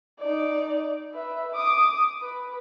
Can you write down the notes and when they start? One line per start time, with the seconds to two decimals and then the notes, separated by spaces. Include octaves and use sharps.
0.20 D#4 D5
1.14 B4 E5
1.54 D6 D#6
2.22 B4